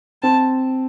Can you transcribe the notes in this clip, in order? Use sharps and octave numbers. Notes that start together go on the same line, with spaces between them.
C4 A5